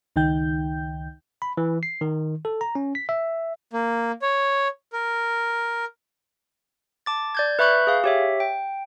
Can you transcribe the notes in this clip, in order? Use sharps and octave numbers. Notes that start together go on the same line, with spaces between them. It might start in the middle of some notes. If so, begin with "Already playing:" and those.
C#2 D#3 D#4 G5 G6
B5
E3
C7
D#3
A4
A#5
C#4
B6
E5
A#3
C#5
A#4
A5 D6 A6
D5 G6 G#6
B4 E5 B5 C#6 F#6 G6
G#4 F5
G4 C#5 E5
G5